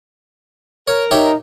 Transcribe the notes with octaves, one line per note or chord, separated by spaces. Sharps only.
A#4 C#5
D#4 G4 C#5 E5